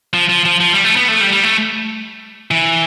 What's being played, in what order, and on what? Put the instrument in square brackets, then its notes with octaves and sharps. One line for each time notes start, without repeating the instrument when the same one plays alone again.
[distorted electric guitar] F3
F3
F3
F3
G3
A3
B3
A3
G3
G3
A3
E3